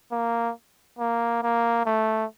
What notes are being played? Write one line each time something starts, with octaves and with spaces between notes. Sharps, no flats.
A#3
A#3
A#3
A3